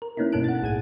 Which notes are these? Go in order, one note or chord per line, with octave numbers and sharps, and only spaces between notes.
A#4
A#3 B3 C#4 D#4 E4
G2 B2 C#4 A4 F#6 D7
F#5 A6
B1 A2 G#4 G#6 D#7